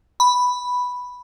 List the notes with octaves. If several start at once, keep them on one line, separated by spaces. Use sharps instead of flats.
B5